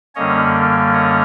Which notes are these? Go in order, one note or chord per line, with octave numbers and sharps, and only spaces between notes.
F#2 D3 G3 A#3 C#4 C#5 D#5
C#5 D#5